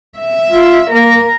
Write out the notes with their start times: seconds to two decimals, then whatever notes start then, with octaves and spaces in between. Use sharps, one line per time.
0.18 E5
0.51 F4
0.91 A#3 A#4